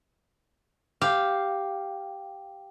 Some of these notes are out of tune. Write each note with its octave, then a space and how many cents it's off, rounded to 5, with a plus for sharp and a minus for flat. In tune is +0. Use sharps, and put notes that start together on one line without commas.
G4 +0 F5 +0